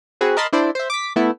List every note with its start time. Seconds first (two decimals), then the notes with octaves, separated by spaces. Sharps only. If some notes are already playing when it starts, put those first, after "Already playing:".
0.21 C4 F#4 G#4 B4
0.37 A#4 D#5 A5 B5 C6
0.53 D4 E4 C5 D5
0.75 C5 E5
0.90 D6 B6
1.16 A3 B3 E4